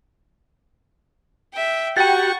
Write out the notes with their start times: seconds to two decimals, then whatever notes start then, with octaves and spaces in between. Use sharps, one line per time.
1.54 E5 G5
1.97 F#4 G4 F#5 G5 C#6 A6